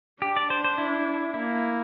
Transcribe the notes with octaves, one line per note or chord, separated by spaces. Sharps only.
D4 G4
D5
C5
C5
E4
A#3 E4